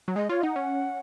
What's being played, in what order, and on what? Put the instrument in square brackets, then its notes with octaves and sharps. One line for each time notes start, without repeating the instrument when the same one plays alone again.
[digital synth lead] F#3
[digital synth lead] G#3 [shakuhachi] D#5
[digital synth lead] F4 [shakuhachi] C#5
[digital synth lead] D#4 [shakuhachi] F#5
[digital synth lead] C#4